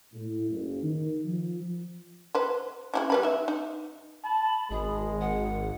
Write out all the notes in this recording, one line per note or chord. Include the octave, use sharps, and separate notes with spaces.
A2
F#1
D#3
F3
B4 C5
C#3 D#4 E4
G3 B4 B5
D#4 E5
D#4
A5 B5
G#1 G#3 G#4
F#5